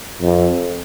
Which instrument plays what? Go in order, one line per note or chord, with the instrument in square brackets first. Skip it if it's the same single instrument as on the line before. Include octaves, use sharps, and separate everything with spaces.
[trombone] F2